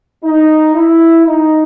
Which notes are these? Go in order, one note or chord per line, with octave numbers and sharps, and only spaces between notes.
D#4
E4
D#4